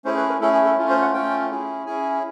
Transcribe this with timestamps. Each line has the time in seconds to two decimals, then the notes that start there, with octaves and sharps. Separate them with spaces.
0.05 A3 C#4 E4 G#4 C5
0.17 B4
0.28 A#4
0.41 A3 C#4 E4 G#4 A4
0.53 G#4
0.65 A4
0.78 A3 C#4 F4
0.89 C5
1.02 F#5
1.13 A3 C#4 F4 G5
1.50 C#4 E4 G#4
1.86 C#4 E4 G#4 G#5